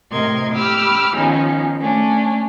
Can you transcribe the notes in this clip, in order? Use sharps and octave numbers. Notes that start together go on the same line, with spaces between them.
A2 C3 A#4 D#5 C6 G#6
G4 B5 D6 E6 F6
D#3 F3 G#3 B3 C#4 D#4
A3 C#4 D4